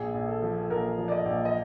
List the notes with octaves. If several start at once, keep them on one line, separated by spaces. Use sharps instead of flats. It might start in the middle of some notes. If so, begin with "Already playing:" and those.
Already playing: A#1 G#4
A#1
A4
F3
A4
A#1 A#4
F3
D5
D#5
A#1
D#5